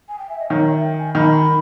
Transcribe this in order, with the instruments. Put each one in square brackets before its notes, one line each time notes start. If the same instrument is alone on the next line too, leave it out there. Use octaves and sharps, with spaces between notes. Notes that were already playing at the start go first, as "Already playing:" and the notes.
[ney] G#5
G5
E5
D#5
[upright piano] D#3 [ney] C#5
[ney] E5
G5
G#5
[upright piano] D#3 [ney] B5